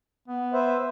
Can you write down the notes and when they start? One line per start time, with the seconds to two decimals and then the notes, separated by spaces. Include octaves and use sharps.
0.28 B3
0.53 B4 C5 E5